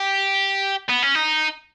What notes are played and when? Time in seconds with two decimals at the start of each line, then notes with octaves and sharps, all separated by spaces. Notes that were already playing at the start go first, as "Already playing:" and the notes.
Already playing: G4
0.89 B3
1.02 C#4
1.15 D#4